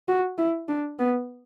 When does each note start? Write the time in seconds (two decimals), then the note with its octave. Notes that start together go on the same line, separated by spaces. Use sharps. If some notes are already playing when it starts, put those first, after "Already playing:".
0.08 F#4
0.38 E4
0.68 D4
0.99 B3